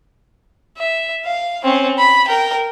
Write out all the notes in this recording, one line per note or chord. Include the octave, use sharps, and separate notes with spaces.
E5
F5
C4 C#4
B5
A#4 G5